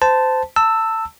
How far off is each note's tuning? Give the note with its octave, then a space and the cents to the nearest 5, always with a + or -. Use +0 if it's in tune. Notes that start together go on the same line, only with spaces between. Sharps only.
C5 -25 A5 +0
A5 +25 E6 +0